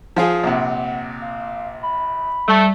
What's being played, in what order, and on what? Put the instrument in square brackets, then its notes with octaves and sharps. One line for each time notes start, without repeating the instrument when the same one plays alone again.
[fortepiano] F3 F4 G#4
[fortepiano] A#1 C3 [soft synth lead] F#5
[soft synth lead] F5
B5
[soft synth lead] G3 [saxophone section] A3